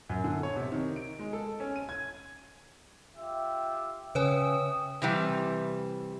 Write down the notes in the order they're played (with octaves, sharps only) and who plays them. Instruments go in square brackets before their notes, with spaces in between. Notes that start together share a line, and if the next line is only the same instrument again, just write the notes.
[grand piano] F#2
D3
C#5
C3
D#3
D7
G#3
A4
C#4
D#7
G#6
[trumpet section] F4 G4 E5
[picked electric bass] C#3 [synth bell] B4 C#5 G#5 [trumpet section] E5 G5 D#6
[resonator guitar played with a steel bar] C3 E3 G3